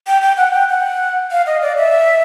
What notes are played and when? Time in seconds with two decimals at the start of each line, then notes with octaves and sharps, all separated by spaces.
0.07 G5
0.22 G5
0.37 F#5
0.53 G5
0.69 F#5
1.31 F5
1.46 D#5
1.62 D5
1.77 E5